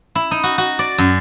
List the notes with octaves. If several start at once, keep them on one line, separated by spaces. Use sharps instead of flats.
E4
D#4
F#4
F#4
D5
F#2